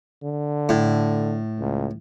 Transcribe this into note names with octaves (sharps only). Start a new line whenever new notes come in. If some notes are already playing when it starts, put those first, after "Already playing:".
D3
A2
C#2